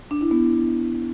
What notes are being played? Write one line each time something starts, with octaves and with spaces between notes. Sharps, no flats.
D4
E4
B3